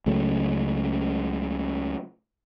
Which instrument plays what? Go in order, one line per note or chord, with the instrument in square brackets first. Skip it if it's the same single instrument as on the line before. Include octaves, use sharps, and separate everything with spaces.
[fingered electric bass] C#2 C#3 F#3 A3